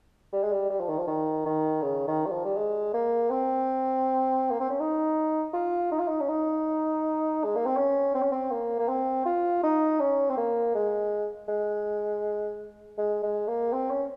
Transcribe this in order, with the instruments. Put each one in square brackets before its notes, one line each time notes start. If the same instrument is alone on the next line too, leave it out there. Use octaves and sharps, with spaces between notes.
[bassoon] G3
G#3
G3
G3
F3
D#3
F3
D#3
D#3
C#3
D#3
G3
F3
G3
G#3
A#3
C4
A#3
C4
C#4
D#4
F4
D#4
F4
D#4
C#4
D#4
G#3
A#3
C4
C#4
C4
C#4
C4
A#3
A#3
C4
F4
D#4
C#4
C4
A#3
G#3
G#3
G#3
G#3
A#3
C4
C#4